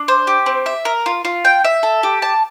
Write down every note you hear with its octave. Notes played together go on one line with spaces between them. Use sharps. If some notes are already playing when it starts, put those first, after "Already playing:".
Already playing: D4
C5
G4
C4
E5
A#4
F4
F4
G5
E5
A4
G4
A5